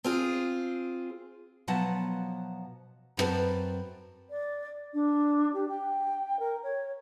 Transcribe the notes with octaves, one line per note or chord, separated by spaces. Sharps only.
C4 F4 G#4
B2 F3 F#3 B3 F#5 A5
F#2 A3 C4 F#4 B4 A5
D5
D4
G4
G5
A#4
C#5